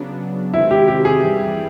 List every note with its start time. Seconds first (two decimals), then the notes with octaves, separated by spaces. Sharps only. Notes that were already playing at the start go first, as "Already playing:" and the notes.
Already playing: C#3 F#3 B3 D4
0.54 C3 D#3 G#3 C4 E4
0.71 G4
0.88 G4
1.05 G#4
1.23 G2 E3 G3